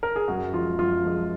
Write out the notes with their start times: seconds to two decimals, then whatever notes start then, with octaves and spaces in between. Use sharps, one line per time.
0.03 A#4
0.16 G#4
0.28 F#2 F#4
0.53 F3 G#3 F4
0.78 F#2 F4
1.04 F3 G#3